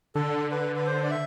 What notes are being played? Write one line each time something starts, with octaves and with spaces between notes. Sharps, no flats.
D3 A4
B4
B4
C5
D5
E5